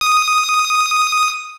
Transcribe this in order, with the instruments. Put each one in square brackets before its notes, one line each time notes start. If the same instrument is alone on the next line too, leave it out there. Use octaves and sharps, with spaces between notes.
[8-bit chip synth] D#6